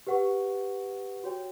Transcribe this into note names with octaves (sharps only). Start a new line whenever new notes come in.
G4 B4 F#5 C#6
F#4 C#5 G5